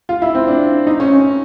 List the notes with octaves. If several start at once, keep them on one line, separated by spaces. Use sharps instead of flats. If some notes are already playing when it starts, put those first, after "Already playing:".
F4
E4
C4
D4
D#4
C#4